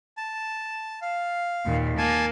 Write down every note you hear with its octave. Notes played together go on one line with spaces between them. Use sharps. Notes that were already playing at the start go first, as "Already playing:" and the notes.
A5
F5
D#2 A#2
A#3 G#5 A5